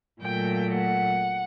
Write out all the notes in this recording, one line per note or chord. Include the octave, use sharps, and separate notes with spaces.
A#2 F#3 A3 G5
F#5